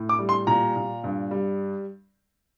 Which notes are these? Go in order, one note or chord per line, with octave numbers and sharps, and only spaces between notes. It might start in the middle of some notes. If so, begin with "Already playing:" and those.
Already playing: A2
D6
G3
C6
A#2 A#5
A#2
G2
G3